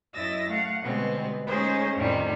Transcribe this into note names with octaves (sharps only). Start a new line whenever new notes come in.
F#2 E4 D#5 E6 A6 A#6
A3 F5 F#5
B2 D3 G3 G#3 B3 C4
G#3 A3 C#4 D#4 G#4 C5
F2 A2 C3 D#3 F3 G3